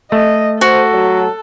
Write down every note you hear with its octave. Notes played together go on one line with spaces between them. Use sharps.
A3 D#5
F#4 A4 C5
F#3